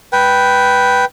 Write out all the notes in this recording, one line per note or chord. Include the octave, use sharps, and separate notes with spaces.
B4 G5